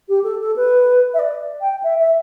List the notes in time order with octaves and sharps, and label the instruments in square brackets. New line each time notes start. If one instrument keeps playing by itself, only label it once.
[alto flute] G4
A4
A4
B4
E5
D5
G5
E5
E5